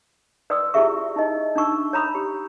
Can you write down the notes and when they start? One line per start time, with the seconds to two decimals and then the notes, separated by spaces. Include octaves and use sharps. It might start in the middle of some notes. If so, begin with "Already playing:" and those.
0.50 B4 D5 G5 C6 D#6 E6
0.74 E4 F4 G4 G#4 E5 C#6
1.16 D#4 E4 D#5
1.56 D4 D#4 C#6 E6
1.93 C#5 A#5 B5 D#6
2.15 G4